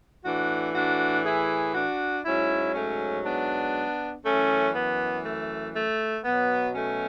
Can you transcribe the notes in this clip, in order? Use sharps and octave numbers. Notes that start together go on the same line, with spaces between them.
A2 E3 D4 F#4
D4 F#4
E4 G#4
D4 F#4
G#2 F#3 C#4 E4
A3 C#4
B3 D4
F#2 E3 A3 C#4
B3
A3
A3
B2 F#3 B3
A3 C#4